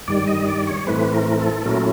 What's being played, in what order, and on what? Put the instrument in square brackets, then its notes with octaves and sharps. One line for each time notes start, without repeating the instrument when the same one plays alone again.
[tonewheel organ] G2 D#3 G3 D5
D#5
D5
C#5
A2 E3 A3 C4 B4
A#4
A4
A#2 F#3 A3 C#4 E4 A#4